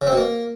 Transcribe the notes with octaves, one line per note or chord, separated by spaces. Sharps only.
C#3
C4
B2
A#3